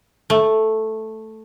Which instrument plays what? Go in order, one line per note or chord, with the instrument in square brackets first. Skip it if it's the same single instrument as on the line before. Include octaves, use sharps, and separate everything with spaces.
[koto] A3